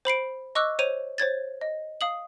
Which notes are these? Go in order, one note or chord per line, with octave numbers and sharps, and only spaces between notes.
C5 B5 C7 D7
D#5 C#6 D6 E6 F#6
C5 C#5 D#7 F7
C5 C#5 G#6 A6
D#5
F5 D#6 F#7